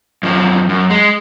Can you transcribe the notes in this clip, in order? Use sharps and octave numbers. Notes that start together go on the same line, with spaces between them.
F#2 F3
F#2
G#3